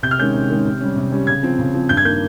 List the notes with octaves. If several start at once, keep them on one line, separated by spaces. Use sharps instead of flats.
C3 G6
F6
D#3 G#3 C#4 G6
C3
D#3 G#3 C#4
C3
G3 C#4
C3
G3 C#4
C#3 G#6
F3 C4
C#3
F3 C4
G2 G6
G#6
D#3 A#3 G6